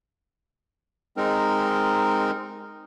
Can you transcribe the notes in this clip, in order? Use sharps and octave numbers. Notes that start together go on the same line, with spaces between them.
G#3 C4 D#4 A#4